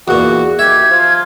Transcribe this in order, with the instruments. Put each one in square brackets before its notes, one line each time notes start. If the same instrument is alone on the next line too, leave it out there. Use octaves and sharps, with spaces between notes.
[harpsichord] E2 A#2 [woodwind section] F#4
[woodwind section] D#3 G4 [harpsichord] E5 [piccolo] G#6
[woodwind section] F3 F4